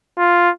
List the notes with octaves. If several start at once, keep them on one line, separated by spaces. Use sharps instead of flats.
F4